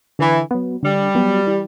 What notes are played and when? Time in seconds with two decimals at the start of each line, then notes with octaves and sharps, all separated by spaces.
0.19 D3 E3
0.51 F#3 B3
0.83 D3 G3
1.15 F#3 B3
1.47 E3